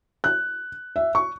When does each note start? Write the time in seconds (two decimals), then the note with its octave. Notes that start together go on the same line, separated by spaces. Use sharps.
0.24 F#6
0.96 E5
1.15 C#6